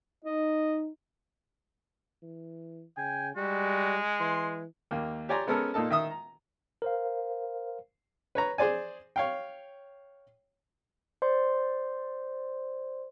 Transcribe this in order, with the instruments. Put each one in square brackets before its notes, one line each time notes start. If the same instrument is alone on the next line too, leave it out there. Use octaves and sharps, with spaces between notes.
[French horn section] D#4 [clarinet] D#5
[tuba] E3
[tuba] C#3 [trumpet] G5 [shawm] G#5
[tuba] G3 [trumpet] G#3 [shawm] F#4
[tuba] E3 [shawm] C6
[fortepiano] D#2 A#3
G4 C#5 D5 G#5 A#5 C6
G#3 B3 C#4 A4 A#4
A#2 A#3 D#4 A4 A5
D#3 E5 D#6
A#5
[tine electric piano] A#4 C5 F5
[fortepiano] B4 C#5 A#5
G#4 C5 D5 G#5
C#5 F5 G5
[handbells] C5 D5 C6